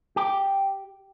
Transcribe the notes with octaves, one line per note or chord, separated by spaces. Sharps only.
G4